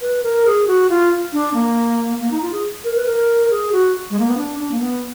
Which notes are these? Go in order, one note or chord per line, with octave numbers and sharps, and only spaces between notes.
B4
A#4
G#4
F#4
F4
D4
A#3
A#3
D#4
F4
G#4
A#4
B4
A#4
G#4
F#4
G#3
A#3
B3
D4
D4
A#3
B3